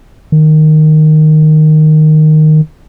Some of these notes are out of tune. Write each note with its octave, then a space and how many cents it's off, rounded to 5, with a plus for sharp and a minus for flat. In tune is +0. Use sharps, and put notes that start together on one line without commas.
D#3 -10